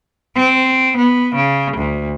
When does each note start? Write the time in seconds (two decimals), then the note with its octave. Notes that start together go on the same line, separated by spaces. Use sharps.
0.35 C4
0.97 B3
1.36 C#3
1.78 D2